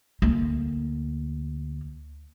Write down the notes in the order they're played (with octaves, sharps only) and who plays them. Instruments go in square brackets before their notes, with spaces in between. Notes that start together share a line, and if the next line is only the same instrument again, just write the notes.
[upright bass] D2 A#3